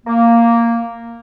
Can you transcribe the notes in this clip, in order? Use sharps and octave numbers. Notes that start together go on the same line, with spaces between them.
A#3